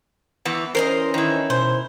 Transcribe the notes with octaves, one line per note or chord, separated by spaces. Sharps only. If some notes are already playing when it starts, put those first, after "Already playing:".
E2 E3 B3
E3 C#4 A#4 C5 C#5 D#5
D#3 E4
B2 C5